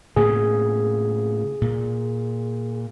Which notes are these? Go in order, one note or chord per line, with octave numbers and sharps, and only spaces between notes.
A2 C#3 A#3 G#4
A#2